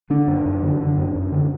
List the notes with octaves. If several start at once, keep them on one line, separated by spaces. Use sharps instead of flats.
D3 D4
F#2
F#2
D3
D3
F#2
F#2
D3